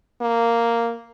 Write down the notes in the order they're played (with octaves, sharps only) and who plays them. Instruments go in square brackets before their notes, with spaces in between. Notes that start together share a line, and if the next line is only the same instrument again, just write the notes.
[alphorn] A#3